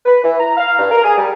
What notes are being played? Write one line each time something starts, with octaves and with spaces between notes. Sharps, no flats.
B4
E3
A#5
F5
G2
A#4
G#4
G3